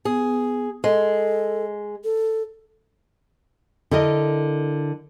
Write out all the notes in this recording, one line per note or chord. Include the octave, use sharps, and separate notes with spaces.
B3 G#4
G#3 A4
A4
D3 E4 A#4 D#5